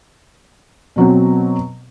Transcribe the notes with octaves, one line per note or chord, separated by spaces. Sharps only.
B2 F#3 C4